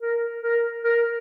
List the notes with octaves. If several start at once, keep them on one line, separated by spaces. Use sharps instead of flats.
A#4
A#4
A#4